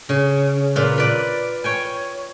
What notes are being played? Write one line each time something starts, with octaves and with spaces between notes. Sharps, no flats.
C#3
A#2 F4 B4
B4 D5
C#5 G5 G#5